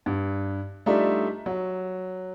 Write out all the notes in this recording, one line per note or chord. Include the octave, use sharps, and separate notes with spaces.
G2
G3 A3 D4 D#4 F4 E5
F#3